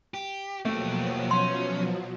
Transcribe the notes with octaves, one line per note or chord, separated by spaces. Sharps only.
G4
B2 F3 F#3 A3 A#3 G4
C#4 C6